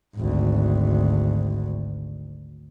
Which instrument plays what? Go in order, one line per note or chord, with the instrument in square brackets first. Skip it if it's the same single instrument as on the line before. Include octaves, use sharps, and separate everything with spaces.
[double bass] G#1 D2